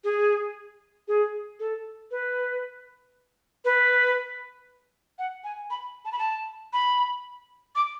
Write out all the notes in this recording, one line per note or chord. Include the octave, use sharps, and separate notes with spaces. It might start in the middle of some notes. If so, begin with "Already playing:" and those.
G#4
G#4
A4
B4
B4
F#5
G#5
B5
A5
B5
A5
B5
D6